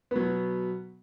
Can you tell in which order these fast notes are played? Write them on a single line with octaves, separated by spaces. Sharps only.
B3 F#3 B2